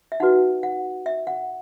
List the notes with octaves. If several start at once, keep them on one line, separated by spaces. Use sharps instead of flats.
E5
D#4 F#4 B4 F#5
F#5
E5
F#5